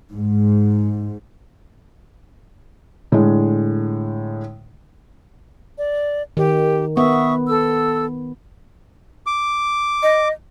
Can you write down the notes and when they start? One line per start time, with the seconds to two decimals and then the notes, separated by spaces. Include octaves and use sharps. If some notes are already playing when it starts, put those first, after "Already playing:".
0.12 G#2
3.12 A2 D3 G#3
5.77 D5
6.37 D#3 G4
6.97 B3 E5 C#6 D#6
7.47 A4 E6
9.26 D6
10.03 D#5